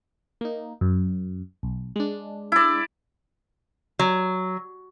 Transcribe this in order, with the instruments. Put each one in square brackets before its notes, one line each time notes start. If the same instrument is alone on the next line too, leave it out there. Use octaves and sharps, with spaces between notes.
[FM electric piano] A#3 D#4
F#2
B1
G#3 D4
[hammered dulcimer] E4 D5
[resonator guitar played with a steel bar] F#3